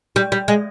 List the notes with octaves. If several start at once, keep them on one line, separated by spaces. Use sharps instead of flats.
G3
G3
G#3